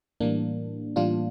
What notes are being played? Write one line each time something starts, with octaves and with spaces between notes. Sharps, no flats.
A2 E3 G3 A#3 D4
A2 E3 G3 D4 F4